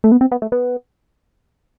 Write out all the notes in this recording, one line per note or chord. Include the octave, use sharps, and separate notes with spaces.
A3
B3
C4
B3
A3
B3